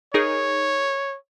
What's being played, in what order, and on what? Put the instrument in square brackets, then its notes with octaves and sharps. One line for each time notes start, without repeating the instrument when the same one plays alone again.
[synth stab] D#4 G#4 A#4 [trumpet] C#5